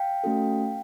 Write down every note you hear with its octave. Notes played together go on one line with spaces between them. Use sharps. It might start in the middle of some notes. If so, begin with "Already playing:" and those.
Already playing: F5 G5
A3 C#4 F#4 A4